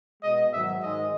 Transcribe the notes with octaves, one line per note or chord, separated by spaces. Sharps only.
B2 G#3 D#5
G#2 D#3 F#3 E5
G#2 D#3 G#3 D#5